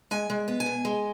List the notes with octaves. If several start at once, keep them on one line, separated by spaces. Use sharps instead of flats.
G#3 G#5
G#3
B3
G#5
B2
G#3